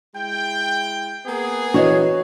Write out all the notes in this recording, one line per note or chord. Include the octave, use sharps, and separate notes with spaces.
G#3 E4 G5
A#3 B3 G#4
E3 F#4 B4 C#5 D#5